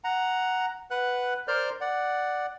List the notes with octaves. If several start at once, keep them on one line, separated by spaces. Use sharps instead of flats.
F#5 A#5
B4 F#5 F#6
A#4 C5 D5 F6 G6
D5 F#5